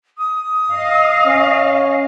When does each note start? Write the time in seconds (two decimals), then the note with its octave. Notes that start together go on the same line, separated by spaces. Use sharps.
0.18 D#6
0.72 D#5 F5
1.26 C#4